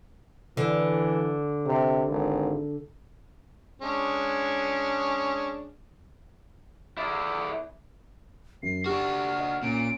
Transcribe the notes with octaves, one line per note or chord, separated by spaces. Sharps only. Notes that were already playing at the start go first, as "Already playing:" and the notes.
D3 E3
C3
G#1
G#3 C#4 D4
E4 D5
F#2 C7
D4 F#4 G4 F6
D#5
A#2 C#4 D7